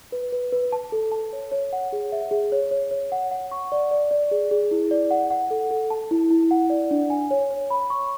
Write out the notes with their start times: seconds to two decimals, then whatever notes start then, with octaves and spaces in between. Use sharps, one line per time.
0.12 B4
0.32 B4
0.53 B4
0.72 A5
0.92 A4
1.12 A5
1.33 C#5
1.52 C#5
1.73 F#5
1.93 G#4
2.12 E5
2.31 G#4
2.52 C#5
2.71 C#5
2.91 C#5
3.12 F#5
3.31 F#5
3.52 C#6
3.72 D5
3.91 D5
4.11 D5
4.31 G#4
4.51 G#4
4.71 E4
4.91 D5
5.11 F#5
5.30 F#5
5.51 A4
5.71 A4
5.90 A5
6.11 E4
6.30 E4
6.51 F#5
6.70 D5
6.91 D4
7.10 G#5
7.31 C#5
7.51 C#5
7.70 B5
7.90 C#6